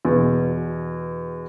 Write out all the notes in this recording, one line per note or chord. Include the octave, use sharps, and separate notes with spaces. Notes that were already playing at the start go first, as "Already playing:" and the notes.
E2 B2